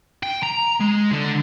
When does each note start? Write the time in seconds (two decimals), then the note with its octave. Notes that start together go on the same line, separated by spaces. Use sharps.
0.23 G5
0.43 A#5
0.80 G#3
1.12 D3